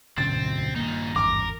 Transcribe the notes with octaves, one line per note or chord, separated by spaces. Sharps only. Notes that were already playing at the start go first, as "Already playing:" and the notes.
D2 G#2 B2 D3 F#3 C4 C#4 A6
G2 A#2 D#3 A#3 D#4
G#1 E2 A#4 D6